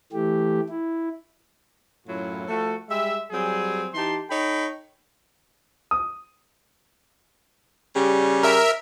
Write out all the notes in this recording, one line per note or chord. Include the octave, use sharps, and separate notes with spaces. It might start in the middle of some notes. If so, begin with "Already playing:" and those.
E3 A3 G4
E4
F#2 A2 F#3 E4 F4
F3 A3 F#4 A4
G3 G#3 E5
F#3 G3 C4 G#4
E3 D#4 G4 A5 C6
D#4 A4 C#5 G5 B5
D#6
C#3 G3
A#4 E5